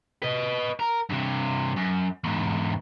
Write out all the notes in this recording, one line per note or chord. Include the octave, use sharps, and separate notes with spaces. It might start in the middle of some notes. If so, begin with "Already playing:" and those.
B4 D#5
A#4
G2 C3
F#2
E2 G#2